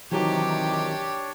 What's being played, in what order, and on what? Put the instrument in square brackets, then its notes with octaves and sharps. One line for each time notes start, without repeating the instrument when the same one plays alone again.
[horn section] C3 D#3 [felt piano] E3 F#3 D#4 [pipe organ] D4 C#5 [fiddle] G4